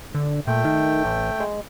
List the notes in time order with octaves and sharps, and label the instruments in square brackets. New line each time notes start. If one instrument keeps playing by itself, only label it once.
[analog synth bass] D3
[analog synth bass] A#2 [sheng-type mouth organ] A3 G5
[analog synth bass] D#3
A1
G#3